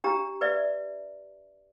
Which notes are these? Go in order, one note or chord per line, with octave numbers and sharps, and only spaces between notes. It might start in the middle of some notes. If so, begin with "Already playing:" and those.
D4 G4 A#5
B4 D5 E5